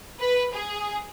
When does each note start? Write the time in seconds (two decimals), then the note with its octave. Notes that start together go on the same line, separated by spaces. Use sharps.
0.20 B4
0.54 G#4